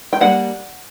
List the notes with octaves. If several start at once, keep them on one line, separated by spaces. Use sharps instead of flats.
G5
G3 A#3 D4 F#5